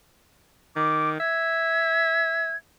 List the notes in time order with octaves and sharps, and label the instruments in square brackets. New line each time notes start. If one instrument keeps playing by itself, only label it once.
[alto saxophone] D#3 [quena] D6
[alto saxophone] E5 [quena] G#6